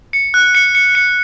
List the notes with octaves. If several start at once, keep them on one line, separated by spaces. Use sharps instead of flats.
C#7
F#6
C#7
C#7
C#7